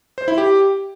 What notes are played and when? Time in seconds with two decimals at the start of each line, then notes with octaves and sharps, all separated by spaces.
0.18 C5
0.28 E4
0.38 G4